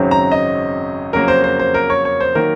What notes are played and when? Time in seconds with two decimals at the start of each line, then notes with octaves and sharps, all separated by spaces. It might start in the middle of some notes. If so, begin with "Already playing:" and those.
Already playing: G#1 F#2 C#3 F#3 C4
0.11 A#5
0.31 D#5
1.13 F2 C#3 F#3 A#3 A#4
1.28 C5
1.44 C5
1.59 C5
1.74 A#4
1.90 C#5
2.05 C#5
2.20 C5
2.35 D#3 F#3 A#3 A#4